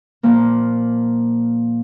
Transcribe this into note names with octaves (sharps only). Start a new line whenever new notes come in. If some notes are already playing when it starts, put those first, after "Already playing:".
A#2 F3 A#3